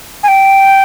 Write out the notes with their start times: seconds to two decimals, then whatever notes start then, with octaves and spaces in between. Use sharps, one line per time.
0.23 G#5
0.28 G5